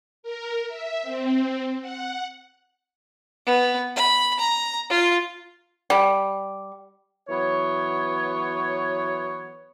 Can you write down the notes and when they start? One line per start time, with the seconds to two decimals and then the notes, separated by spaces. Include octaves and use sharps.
0.23 A#4
0.68 E5
1.03 C4
1.81 F#5
3.46 B3
3.96 B5
4.39 A#5
4.90 F4
5.90 G3
7.29 E3 F#3 B3 C#5